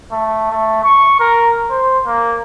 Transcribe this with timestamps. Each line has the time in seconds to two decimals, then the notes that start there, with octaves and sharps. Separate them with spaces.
0.11 A3
0.51 A3
0.84 C#6
1.20 A#4
1.70 C5
2.06 A#3